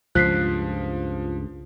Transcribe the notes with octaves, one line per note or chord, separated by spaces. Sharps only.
C#2 G2 F3 F#6 B6 C7